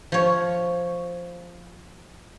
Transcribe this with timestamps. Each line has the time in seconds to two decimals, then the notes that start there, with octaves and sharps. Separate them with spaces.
0.12 F3 C#5